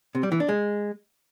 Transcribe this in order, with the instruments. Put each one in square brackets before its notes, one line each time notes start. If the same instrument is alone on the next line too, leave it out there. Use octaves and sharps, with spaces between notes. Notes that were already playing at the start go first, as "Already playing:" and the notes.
[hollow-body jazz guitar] C3
G3
E3
D4
G#3